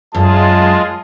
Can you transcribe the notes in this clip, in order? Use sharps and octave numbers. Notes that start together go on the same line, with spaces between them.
F#2 G#3 F4 G#4 A5